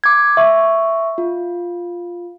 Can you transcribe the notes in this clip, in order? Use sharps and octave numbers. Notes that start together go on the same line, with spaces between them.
D6 G#6
E5 C#6
F4